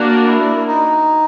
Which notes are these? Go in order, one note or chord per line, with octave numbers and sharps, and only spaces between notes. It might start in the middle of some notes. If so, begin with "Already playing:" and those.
Already playing: A#3 D4 F#4 A#4 D5
E4
D#4